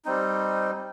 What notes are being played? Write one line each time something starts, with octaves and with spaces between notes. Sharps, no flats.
G3 C4 D#4